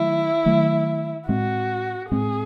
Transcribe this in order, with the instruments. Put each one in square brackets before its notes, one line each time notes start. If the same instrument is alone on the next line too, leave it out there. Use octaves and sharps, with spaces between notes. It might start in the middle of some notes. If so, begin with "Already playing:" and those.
Already playing: [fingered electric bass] D#3 F#3 A3 [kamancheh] E4
[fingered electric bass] D#3 F#3 A3
[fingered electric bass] A2 G#3 C4 [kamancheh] F#4
[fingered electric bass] A2 G#3 C4 [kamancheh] G#4